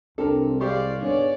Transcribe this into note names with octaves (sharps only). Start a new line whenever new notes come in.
C2 C4 D4 A4 A#4
G#3 G4 C5 D5 F5 C#6
G#2 D3 B3 G#4 C#5 D5